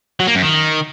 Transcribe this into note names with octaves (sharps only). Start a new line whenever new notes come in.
F#3
A#3
F#2
D#3